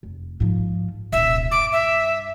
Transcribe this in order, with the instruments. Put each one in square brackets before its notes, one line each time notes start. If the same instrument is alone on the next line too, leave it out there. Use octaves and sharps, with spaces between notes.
[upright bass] F1
G#2 F3
[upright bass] D#1 C2 [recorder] E5
[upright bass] G2 [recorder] D6
[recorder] E5